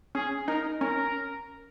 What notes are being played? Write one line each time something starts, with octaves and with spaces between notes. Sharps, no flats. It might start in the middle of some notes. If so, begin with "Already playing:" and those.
C#4 G#4
D#4 A#4
C#4 A#4